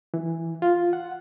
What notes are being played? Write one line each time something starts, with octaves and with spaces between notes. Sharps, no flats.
E3
F4
F#5